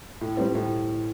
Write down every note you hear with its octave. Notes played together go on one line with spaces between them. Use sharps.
A2
G3 C4
A2